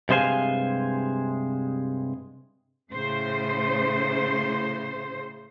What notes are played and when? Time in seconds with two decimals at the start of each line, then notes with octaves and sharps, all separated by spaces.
0.09 G2 C3 G#3 C5 F5 G#5
2.91 A2 C#3 C5